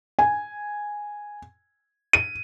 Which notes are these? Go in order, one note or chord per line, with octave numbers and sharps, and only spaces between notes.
G#5
D#7